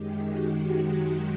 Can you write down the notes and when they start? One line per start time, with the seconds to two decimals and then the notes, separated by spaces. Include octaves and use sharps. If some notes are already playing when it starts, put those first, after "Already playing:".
Already playing: F#2 D#3 G#3 G4
0.23 F#4
0.57 F#4